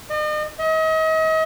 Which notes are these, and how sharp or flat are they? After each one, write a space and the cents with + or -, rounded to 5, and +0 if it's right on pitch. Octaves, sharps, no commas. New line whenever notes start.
D#5 -40
D#5 +40